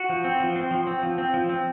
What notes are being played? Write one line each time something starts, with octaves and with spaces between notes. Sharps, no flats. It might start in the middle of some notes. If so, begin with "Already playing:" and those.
Already playing: F#4
F3
C4
F3
C4
F3
C4
F3
C4
F3
C4